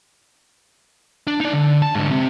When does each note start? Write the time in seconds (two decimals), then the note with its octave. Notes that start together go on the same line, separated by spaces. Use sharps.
1.27 D4
1.41 D#4 D5
1.53 D3
1.82 A5
1.95 G#2 D3
2.11 C3